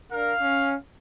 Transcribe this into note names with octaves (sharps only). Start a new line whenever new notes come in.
D4 A#4 F5
C#4